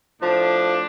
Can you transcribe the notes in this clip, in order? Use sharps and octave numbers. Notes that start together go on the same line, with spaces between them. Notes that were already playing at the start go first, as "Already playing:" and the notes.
A2 F3 D4